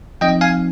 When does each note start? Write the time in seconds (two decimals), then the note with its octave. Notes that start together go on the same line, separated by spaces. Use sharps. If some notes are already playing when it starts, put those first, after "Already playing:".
0.21 F3 C4 D#4 D#5 G5
0.41 F5 G#5